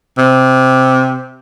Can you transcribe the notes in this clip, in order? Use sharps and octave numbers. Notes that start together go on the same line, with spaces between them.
C3